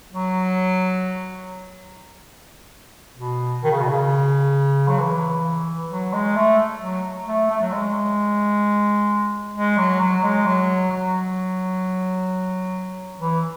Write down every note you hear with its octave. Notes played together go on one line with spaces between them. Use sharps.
F#3
B2
D#3
C#3
B2
C#3
F#3
E3
F#3
G#3
A3
F#3
A3
A3
F#3
G#3
G#3
F#3
F#3
G#3
F#3
F#3
E3